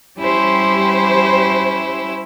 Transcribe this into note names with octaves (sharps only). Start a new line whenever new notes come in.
G3 C#4 E4 G4 C5